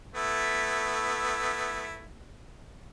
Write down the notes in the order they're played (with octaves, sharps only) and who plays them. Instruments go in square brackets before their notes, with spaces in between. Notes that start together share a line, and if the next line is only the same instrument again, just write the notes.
[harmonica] A3 B3 E4